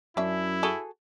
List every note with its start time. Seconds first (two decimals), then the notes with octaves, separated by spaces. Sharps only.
0.17 F#2 C#4 D4 E4 E5
0.63 F#4 G#4 A4